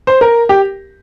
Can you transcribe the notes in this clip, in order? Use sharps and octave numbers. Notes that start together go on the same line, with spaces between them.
C5
A#4
G4